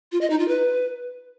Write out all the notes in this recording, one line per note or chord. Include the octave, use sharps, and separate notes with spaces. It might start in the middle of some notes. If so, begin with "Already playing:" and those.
F4
D#5
D#4
F4
B4